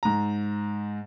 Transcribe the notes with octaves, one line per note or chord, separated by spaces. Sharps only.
G#2 A#5